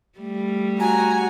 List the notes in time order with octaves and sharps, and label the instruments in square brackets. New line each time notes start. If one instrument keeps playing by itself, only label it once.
[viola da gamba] G3 A3
[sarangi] F#4 [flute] G#5 [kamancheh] A#5